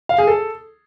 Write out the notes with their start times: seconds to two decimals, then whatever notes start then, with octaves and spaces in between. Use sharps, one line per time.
0.09 F5
0.18 G#4
0.27 A4